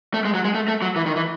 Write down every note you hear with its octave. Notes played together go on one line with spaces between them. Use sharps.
A3
G#3
F#3
G#3
A3
A3
F#3
E3
D#3
E3